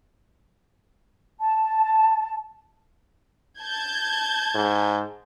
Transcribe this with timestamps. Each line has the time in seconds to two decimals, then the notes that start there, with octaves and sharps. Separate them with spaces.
1.40 A5
3.60 A5 G6 G#6
4.55 G#2